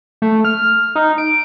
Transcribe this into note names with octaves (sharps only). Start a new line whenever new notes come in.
A3
F6
D#4
D7